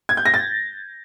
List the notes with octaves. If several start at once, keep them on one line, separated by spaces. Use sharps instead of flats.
G#6
G6
A#6
A6